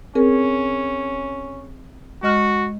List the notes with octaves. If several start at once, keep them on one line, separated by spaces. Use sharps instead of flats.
C4 C#4 G#4 A#4
G#3 F#4 D#5 F6